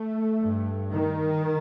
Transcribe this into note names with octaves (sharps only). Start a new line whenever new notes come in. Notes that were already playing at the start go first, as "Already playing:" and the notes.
Already playing: A3
G2
D#3